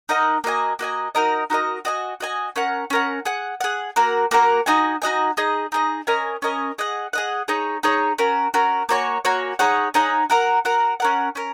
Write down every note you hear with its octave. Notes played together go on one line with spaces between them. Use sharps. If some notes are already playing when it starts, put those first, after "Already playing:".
D#4 A#4 D#5 F#5
A#3 F#4 D#5 G#5
A#3 F#4 D#5 G#5
D#4 F#4 A#4 D#5
D#4 F#4 A#4 D#5
F#4 D#5 G#5
F#4 D#5 G#5
C#4 A#4 F#5
C#4 A#4 F#5
G#4 F#5
G#4 F#5
A#3 F#4 A#4 F#5
A#3 F#4 A#4 F#5
D#4 F#4 D#5 G#5
D#4 F#4 D#5 G#5
D#4 G#4 D#5
D#4 G#4 D#5
C#4 A#4 D#5 G#5
C#4 A#4 D#5 G#5
G#4 D#5 F#5
G#4 D#5 F#5
D#4 G#4 C#5
D#4 G#4 C#5
C#4 F#4 A#4
C#4 F#4 A#4
A#3 F#4 C#5 G#5
A#3 F#4 C#5 G#5
D#4 G#4 C#5 F#5
D#4 G#4 C#5 F#5
F#4 A#4 F#5
F#4 A#4 F#5
C#4 A#4 F#5
C#4 A#4